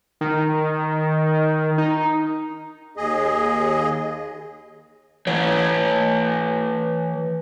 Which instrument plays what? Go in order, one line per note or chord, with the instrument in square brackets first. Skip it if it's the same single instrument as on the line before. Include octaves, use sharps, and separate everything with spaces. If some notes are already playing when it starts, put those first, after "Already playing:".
[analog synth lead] D#3
D#4
[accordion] D#2 G#4 D#5
[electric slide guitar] E3 C#5